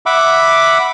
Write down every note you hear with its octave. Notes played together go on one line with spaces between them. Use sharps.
E5 F#5 B5 D6